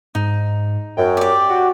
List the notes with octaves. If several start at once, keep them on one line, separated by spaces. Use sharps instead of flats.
G#2 D#4
F#2 G5
G4 D5
F#4